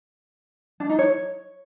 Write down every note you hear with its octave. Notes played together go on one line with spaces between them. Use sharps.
D4
D#4
C#5